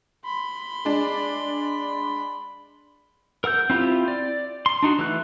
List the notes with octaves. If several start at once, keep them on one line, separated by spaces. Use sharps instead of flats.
B5 C6
G#3 D4
A#4 F#5 E6 G6
C4 E4 F4 G4
D5
C6
D4 D#4 F#4
E3 A3 F#6